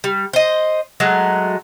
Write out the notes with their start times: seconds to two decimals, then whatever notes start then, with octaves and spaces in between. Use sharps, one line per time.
0.04 G3
0.33 C5 D#5
1.00 F#3 G#3 A3